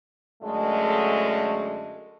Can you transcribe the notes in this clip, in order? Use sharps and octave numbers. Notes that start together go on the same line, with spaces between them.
F#2 D3 G#3 A3